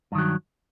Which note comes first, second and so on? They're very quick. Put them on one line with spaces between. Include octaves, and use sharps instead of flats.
G2 D#3 F#3